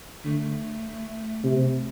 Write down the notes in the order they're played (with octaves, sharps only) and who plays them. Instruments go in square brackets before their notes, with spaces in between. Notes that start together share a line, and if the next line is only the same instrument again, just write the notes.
[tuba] D3 [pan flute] A3
[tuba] C3